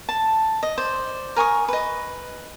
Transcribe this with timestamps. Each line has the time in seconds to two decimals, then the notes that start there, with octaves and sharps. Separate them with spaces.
0.09 A5
0.63 D#5
0.78 C5 D5
1.36 A#4 G#5 C#6 D#6
1.68 B4 D#5